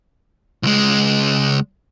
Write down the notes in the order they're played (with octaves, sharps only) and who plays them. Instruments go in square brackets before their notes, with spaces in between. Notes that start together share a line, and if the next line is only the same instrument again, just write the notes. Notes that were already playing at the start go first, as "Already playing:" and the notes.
[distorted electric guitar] C#2 G#3